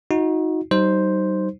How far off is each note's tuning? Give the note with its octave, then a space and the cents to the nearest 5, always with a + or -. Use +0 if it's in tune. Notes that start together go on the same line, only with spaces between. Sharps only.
D#4 +20 F#4 -25
G3 -40 D#4 +0 C5 +0